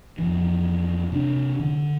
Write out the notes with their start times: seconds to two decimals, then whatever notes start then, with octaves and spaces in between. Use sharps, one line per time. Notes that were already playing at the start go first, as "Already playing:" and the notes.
0.18 F2 E3
1.12 C3 D4
1.59 D3